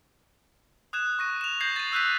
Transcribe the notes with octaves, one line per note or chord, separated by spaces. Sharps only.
D#6 F#6 G#6 E7
C#6 A#6 D#7
E7 F7
G6 G#6 A#6 C7 F#7
A6 D#7
E6 F#6 G6 B6 D#7